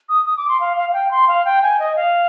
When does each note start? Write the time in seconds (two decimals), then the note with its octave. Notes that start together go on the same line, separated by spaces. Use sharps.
0.09 D#6
0.26 D#6
0.37 D6
0.48 C6
0.60 F5
0.77 F5
0.89 F5
0.94 G5
1.11 C6
1.28 F5
1.45 G5
1.62 G#5
1.79 D#5
1.96 F5